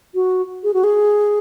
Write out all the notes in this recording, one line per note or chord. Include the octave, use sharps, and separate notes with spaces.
F#4
G#4
F#4
G#4